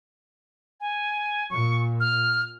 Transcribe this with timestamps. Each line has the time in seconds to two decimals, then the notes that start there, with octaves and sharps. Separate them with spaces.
0.80 G#5
1.50 A#2 C#6
2.00 F6